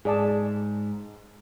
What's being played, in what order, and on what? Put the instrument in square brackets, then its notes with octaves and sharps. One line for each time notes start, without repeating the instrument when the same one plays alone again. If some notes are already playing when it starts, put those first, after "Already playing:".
[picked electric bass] G#2 [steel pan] G#4 D5 A5